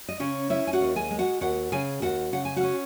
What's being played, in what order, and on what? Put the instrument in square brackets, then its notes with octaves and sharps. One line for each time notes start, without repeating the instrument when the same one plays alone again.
[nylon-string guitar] D#5
C#3 C#4 C#5
C#4 E4 E5
G#5
F#4 F#5
D#2
G#4 G#5
G#3
F#4 F#5
D#2 F#4 F#5
C#3 G#4 G#5
D#2 F#4 F#5
C#3 F#5
G#5
F#4 F#5
C#4